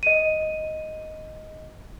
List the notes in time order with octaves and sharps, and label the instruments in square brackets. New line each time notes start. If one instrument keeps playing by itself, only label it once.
[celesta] D#5 D#7